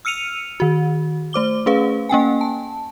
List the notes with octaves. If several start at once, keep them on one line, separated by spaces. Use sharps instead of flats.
E6 F6 C#7 D#7 F7
D#3 F#4
A3 C5 D6 G7
A3 C#4 G#4 B4 F5
A#3 C#4 G5 G#5
A5